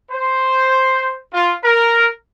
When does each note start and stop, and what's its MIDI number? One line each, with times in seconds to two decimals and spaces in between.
0.11 1.16 72
1.33 1.53 65
1.64 2.07 70